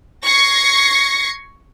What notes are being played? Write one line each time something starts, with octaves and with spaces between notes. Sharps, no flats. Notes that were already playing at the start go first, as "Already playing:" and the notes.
C#6 G#6 A#6 C7 C#7